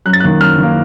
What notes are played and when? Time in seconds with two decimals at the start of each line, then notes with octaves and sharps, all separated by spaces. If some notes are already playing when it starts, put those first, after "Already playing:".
0.06 F#2 F#6
0.13 A6
0.20 D#3 A#3 F#6
0.41 F#2 F6
0.59 D#3 A#3